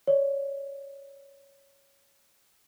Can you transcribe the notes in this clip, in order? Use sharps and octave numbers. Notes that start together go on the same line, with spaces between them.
C#5 D5